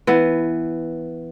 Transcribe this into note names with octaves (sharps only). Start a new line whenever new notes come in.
E3 B3